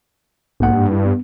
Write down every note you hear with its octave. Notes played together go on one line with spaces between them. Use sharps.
B1 G#2 A#3 F#5
G2
E4
B3